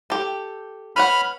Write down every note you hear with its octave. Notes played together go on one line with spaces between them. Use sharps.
G4 A4
B4 C#5 F#5 B5 F6